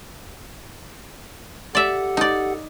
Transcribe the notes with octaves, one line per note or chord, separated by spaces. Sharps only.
G4 A4 D5 E5 F#5
D#4 D5